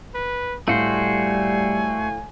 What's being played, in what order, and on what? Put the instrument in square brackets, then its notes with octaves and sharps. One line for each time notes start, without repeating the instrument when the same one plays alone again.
[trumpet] B4
[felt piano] A2 F5 [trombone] G3 [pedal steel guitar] A3 F#4 C5 [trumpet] G#5